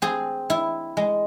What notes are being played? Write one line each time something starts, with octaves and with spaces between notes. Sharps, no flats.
C4 G#4
E4
G#3